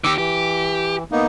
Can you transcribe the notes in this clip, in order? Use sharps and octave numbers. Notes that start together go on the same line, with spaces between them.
D#3 G4 D6 E6
E3 G4
A#3 B3 D#4